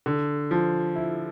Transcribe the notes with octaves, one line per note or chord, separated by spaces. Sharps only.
D3
F3
E4